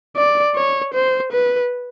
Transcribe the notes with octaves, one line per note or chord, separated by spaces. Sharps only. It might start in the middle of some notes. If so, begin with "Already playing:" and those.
D5
C#5
C5
B4